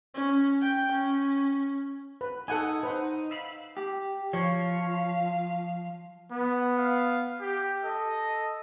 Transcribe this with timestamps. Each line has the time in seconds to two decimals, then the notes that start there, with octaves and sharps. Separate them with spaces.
0.14 C#4
0.62 G5
0.92 C#4
2.21 B4
2.48 D#4 A4 F#5 G#5
2.83 D#4 B4 C5 F#5
3.31 E5 F5 B5
3.77 G4
4.33 F3 C#5 F5
6.32 B3
6.78 F5
7.41 G4
7.84 A4 D#5